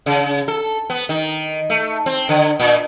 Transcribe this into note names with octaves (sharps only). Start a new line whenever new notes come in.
C#3
A4
B3
D#3
A3
C4
D3
A#2